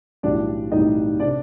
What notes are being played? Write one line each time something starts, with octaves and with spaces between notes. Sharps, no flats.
B1 A2 E3 G3 D4 D5
B1 A2 E3 G3 D#4 D#5
C3 D4 D5